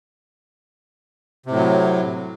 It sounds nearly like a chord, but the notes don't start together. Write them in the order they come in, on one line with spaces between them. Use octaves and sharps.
C3 A2 F#3